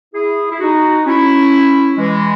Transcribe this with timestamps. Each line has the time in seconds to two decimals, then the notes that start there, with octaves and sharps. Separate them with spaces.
0.14 E4 G#4
0.51 E4
0.60 D#4 F#4
1.06 C#4 E4
1.98 E3 G#3